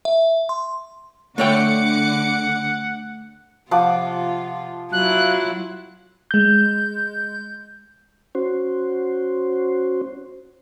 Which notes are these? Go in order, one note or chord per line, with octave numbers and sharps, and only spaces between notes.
E5
C6
D3 A3 C#5 F#5 G5 D6 C#7
C3 F3 F4 F#5 D6
F#3 E4 F4 F#6
G#3 G6
C#4 F#4 C5